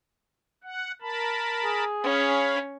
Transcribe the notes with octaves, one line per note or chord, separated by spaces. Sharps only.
F#5
A#4 A5 B5
G#4
C#4 C#5 F5 B5